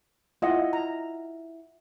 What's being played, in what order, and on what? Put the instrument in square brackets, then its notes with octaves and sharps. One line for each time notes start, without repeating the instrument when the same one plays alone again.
[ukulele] E4 F#5 [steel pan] F4 D#5
[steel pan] A#5